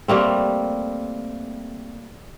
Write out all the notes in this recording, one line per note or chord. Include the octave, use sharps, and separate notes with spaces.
G3 A3 A#3 C4